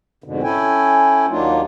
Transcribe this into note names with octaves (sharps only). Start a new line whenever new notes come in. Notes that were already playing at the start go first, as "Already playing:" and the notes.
F2 G#2 B2 D3
C#4 E4 A4 G5 G#5
D#2 F#3 A#3 D4 D#4 F4